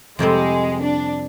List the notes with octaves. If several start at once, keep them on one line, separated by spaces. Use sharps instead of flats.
F2 C3 G3 G#3 C4
D4